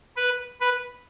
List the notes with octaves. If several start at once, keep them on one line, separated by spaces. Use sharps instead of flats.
B4
B4